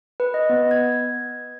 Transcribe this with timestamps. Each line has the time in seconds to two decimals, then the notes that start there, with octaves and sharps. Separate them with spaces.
0.20 B4
0.34 D#5
0.49 B3
0.71 G#6